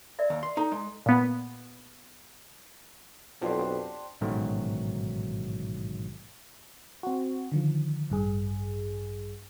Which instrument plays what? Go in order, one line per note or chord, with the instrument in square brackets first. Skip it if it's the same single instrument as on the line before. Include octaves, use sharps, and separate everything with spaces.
[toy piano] A#4 D5 E5
[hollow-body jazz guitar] D#2
C6
[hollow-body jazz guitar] D#4 [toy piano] A4
[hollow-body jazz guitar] G#3
[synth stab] A#2 B3
[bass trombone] B1 [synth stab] F2 [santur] D4 G4 C5
[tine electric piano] A1 G#2 B2 D#3 F#3 A3
[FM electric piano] C4 F#4
D3 D#3 F3
A1 G2 G#4